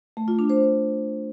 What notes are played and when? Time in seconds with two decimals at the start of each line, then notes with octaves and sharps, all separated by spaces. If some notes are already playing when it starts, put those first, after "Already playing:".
0.17 A3
0.28 F4
0.39 D4
0.50 C5